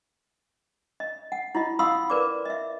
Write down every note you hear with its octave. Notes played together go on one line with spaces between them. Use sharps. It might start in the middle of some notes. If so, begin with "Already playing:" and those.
D#5
F#5
E4 F4 D#5
F5 F#5 B5 C6 D#6 E6
A#4 B4 D5 D6
D#5 E5